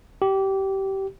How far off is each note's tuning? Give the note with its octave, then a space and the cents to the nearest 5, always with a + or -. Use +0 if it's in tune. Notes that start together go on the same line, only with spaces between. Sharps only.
G4 -20